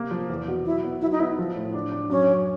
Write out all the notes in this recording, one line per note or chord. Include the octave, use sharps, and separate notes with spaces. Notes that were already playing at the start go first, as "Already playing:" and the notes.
Already playing: C3 A#3
F3
E2
B2
F#3 E4
B3
F#3 E4
D#4
B3 E4
F3
A2
D4
D4
F#2 C#4
F#2